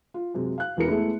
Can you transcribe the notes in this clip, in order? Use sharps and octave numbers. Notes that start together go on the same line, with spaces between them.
F4
F#2 C3 G#3
F5 F#6
E1 E2 E3 G#4 A#4 C#7
G#3 A3 B3 E4